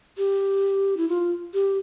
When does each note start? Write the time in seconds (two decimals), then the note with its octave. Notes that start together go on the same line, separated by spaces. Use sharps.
0.17 G4
0.97 E4
1.09 F4
1.54 G4